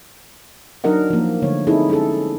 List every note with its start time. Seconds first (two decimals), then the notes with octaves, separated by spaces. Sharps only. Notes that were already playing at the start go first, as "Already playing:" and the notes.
0.84 F#3 D4 D#4 A#4 D#5 F#5
1.10 F3 A#3
1.42 D3 G#3 A3 C#5
1.67 A3 C4 D#4 E4 G#4 A4
1.89 G#3 C#4 E4 G#4 A4